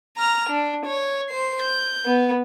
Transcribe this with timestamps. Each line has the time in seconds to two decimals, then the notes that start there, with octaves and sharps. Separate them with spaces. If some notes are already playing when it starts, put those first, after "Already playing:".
0.17 A#5 F6
0.49 D4
0.86 C#5
1.30 C5 C7
1.63 G6
2.05 B3